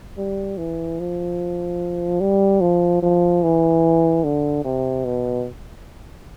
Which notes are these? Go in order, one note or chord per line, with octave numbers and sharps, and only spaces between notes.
G3
E3
F3
G3
F3
F3
E3
D3
C3
B2